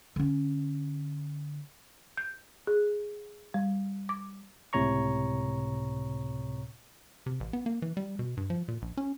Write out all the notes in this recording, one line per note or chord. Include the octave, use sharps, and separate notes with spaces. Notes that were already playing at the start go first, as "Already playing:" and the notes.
D3 C#4
G6
G#4
G3
D6
C#2 A2 C3 C#5 A#5 C#6
C3
A1
B3
A#3
E3
G3
B2
G2
F3
A#2
A#1
C#4